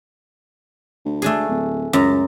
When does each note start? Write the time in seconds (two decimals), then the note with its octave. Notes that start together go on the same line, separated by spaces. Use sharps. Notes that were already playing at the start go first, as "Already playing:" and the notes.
1.05 D2
1.22 A3 D4 G#4
1.49 D1
1.93 C#2 F#2 A#5